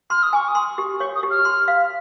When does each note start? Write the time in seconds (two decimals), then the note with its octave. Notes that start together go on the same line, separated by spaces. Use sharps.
0.10 C6 F6
0.23 D#6
0.33 G#5 C#6
0.48 D#6
0.55 C6
0.78 G4
1.00 C#5 C#6
1.15 D#6
1.23 G4
1.30 F6
1.45 C6
1.68 F5